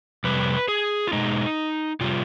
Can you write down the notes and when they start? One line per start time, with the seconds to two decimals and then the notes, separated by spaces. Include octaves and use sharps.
0.24 F2 C3 G3 B4
0.68 G#4
1.08 F4
1.13 B2 G#3 D#4
2.01 C3 G3 F4